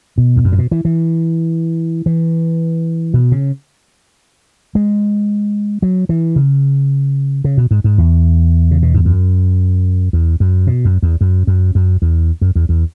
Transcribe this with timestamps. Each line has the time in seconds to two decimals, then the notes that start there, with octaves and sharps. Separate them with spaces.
0.18 B2
0.37 E2
0.44 F#2
0.52 G#2
0.58 B2
0.71 E3
0.85 E3
2.06 E3
3.14 B2
3.32 C#3
4.75 G#3
5.82 F#3
6.09 E3
6.36 C#3
7.44 C#3
7.57 B2
7.71 G#2
7.84 G#2
7.98 E2
8.71 C#3
8.82 B2
8.94 G#2
9.05 F#2
10.13 E2
10.40 F#2
10.67 B2
10.85 F#2
11.03 E2
11.21 F#2
11.47 F#2
11.75 F#2
12.02 E2
12.41 F#2
12.55 E2
12.69 E2